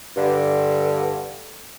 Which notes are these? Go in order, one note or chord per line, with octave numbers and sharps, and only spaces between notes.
G2 D3